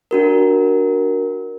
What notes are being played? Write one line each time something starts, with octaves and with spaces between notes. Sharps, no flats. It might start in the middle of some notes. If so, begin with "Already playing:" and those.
D4 F#4 A#4